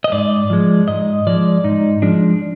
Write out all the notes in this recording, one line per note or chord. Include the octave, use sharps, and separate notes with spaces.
D#5
G#2 D5
F3 G#3
G#2 D#5
F3 G#3 D5
G#2 D#4
F3 G#3 D4